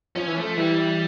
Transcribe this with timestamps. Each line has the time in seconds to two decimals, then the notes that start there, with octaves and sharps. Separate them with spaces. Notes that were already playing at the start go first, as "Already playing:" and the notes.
0.16 F3 C#4
0.28 E3
0.37 F3 A3
0.57 E3 G3